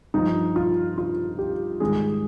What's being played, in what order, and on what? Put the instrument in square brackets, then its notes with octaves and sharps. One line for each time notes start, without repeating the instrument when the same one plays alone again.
[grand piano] G2 F3 D#4
F4
F4
G4
G#2 D#3 G3 G#4